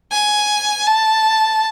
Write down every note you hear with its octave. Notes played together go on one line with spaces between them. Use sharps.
G#5
A5